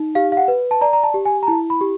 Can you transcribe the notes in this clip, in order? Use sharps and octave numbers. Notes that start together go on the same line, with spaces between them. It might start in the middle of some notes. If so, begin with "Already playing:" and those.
Already playing: D#4
G4 F5
F5
F#5
B4
A5
D5 A#5
A#5
A5
G4
G#5
A#5
E4 A5
B5
G4